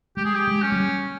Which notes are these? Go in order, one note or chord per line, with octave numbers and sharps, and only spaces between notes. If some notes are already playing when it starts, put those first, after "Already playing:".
G#3 G4
G#4
G4
G#3
C#4
G#3
G3